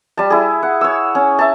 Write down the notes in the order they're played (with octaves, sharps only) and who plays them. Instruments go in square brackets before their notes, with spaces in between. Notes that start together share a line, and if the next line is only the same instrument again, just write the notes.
[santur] G3 A5
E4 G#4
F#5
C#5 E6
C#4
E5 A5